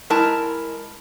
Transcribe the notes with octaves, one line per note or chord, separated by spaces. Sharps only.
G#3 E4 A#4 A5